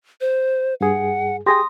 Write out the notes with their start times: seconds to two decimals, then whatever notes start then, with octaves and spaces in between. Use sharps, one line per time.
0.21 C5
0.81 G2 G#4 F#5
1.46 G4 G#4 G5 C6 D#6 A#6